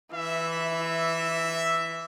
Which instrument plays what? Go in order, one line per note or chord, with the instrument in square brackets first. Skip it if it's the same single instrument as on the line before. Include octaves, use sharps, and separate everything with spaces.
[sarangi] E3 [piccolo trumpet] E5